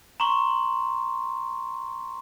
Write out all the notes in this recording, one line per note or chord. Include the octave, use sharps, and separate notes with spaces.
A#5 C6 C#6